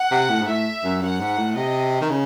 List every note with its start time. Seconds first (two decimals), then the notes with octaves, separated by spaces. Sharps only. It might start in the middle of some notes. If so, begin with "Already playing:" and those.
Already playing: F#5
0.11 C3
0.29 A2
0.41 G#2
0.48 A2 E5
0.84 F#2
1.02 F#2 F#5
1.20 G#2
1.38 A2
1.56 C3 D#5
2.01 D#3
2.10 C#3